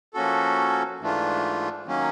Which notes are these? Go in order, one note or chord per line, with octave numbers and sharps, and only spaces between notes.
F3 A#3 C#4 F#4 A4
G#2 E3 A3 D4 F4
D#3 F#3 A#3 C#4